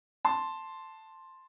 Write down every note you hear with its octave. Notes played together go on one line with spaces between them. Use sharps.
A5 C6